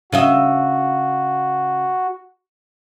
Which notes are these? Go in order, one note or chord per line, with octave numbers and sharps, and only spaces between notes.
C#3 F#4 D#5 E5